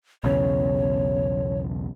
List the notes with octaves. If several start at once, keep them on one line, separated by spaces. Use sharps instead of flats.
B1 E2 C#3 C#5